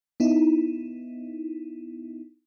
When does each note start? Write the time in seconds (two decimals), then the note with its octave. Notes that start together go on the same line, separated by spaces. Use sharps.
0.20 B3 D#4 E4